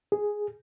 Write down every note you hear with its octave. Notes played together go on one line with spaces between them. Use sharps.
G#4